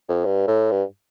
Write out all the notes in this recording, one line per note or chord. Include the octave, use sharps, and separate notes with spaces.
F2
G2
A2
G2